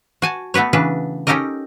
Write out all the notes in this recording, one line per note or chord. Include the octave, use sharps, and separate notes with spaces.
F#4 G#5 A5
A3 B3 F#4 B4 C#5
C#3 E3 D4 B4
C#4 D#4 G4 A4 A#4 D#5